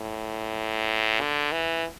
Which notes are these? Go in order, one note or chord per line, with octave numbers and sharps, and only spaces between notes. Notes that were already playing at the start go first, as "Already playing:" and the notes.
Already playing: A2
D3
E3